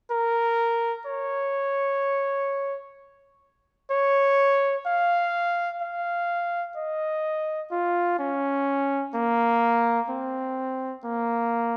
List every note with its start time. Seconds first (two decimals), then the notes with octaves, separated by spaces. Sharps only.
0.11 A#4
1.06 C#5
3.91 C#5
4.86 F5
5.81 F5
6.77 D#5
7.72 F4
8.19 C#4
9.15 A#3
10.09 C4
11.05 A#3